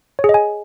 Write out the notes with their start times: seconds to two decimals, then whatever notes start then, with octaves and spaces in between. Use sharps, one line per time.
0.19 C#5
0.24 G#4
0.29 D#5
0.34 G#5